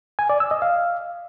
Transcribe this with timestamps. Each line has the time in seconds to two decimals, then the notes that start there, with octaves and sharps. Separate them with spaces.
0.19 G#5
0.30 D5
0.40 E6
0.51 D#5
0.62 F5